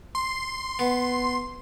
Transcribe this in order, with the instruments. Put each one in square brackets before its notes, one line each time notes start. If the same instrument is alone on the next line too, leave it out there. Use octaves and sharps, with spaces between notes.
[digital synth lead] C6
[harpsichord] B3